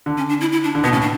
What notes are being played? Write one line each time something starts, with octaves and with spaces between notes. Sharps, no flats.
D3
C#4
D4
E4
E4
D4
D3
B2 B3
A2 C#4
D4